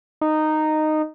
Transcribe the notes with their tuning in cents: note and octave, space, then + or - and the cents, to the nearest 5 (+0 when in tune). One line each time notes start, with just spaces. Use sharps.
D#4 -10